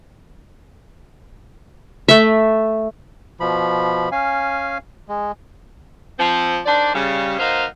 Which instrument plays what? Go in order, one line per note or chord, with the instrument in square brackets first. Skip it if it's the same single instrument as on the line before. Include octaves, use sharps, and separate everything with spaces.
[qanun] A3 E5
[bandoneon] B2 F3 B5
C#4 F5 G#5
G#3
[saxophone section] F3 C4
D#3 D4 C5 D5
C#3 G3
F#3 A#3 D#4 B4 C5 F5